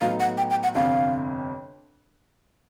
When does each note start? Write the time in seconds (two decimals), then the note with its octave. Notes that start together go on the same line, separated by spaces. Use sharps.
0.01 A2 F#3 B3 D#4 F5
0.20 F#5
0.38 G5
0.50 G5
0.63 F#5
0.75 G1 F2 C3 F5